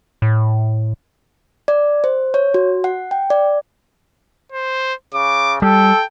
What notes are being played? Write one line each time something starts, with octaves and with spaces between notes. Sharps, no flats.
A2
D5
C5
C#5
F#4
F#5
G5
D5
C5
C#3 D6
G3 A4 G5